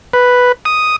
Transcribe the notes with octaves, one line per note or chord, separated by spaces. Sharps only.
B4
D#6